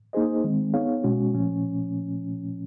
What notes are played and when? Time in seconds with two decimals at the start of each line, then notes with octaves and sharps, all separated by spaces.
0.13 A#3 D#4 G#4 C5 D#5
0.44 D#3 G#3 C4
0.74 B3 D#4 G#4 C#5 F5
1.04 B2 G#3 C#4 F#4
1.34 A#2 F3 A3 C#4